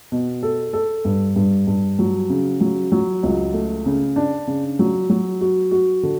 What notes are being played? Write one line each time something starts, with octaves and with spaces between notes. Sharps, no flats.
B2
A4
A4
G2
G2
G2
F#3
C#3
F#3
F#3
C#2
A3
C#3
D4
C#3
F#3
F#3
F#4
F#4
D3